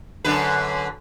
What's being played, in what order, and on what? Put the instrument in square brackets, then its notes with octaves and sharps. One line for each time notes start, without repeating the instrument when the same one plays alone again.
[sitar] F#2 D3 B4